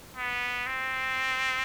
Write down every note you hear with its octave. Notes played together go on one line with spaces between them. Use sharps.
B3
C4